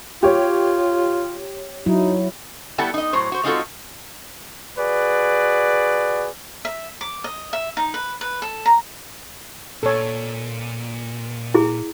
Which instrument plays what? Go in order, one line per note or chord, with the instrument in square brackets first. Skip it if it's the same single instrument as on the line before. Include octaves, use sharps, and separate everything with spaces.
[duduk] F4 [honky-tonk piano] G4 C#5
[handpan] F#3 E4 [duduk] D#4
[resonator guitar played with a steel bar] G3 B3 E4 A4 F#5 A5
D#4 D#5
A2 F#3 C5
F#4 C5
G#3 C4 D#4 F4 F#4 A4
[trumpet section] F#4 G#4 B4 D5
[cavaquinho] E5
D6
D#5
E5
D#4
B4
B4
A4
A#5
[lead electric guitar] A#2 [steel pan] A4 C#5
[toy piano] E4 G#4